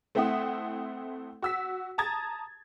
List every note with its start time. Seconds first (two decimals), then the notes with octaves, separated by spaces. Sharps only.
0.15 A3 C4 E4 E5 F#5 D#6
1.42 F#4 E6 B6
1.98 A5 A#5 D#6 G#6 A6